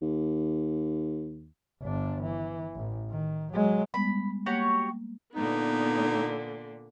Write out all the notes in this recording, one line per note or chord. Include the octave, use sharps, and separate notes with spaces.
D#2
G1 D4
E3
A1
D#3
F#3 G#3
G3 G#3 B3 B5
A#3 F#4 G4 C#5
A#2 D3 B3 D#4